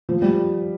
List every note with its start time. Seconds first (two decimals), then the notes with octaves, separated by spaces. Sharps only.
0.09 F3
0.22 G3